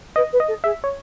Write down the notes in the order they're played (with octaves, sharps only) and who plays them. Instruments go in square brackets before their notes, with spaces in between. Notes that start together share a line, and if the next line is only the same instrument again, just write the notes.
[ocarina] B4 [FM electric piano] D#5
[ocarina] B4
[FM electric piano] D#5
[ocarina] A4
[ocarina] G#4 [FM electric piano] E5
[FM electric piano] C#5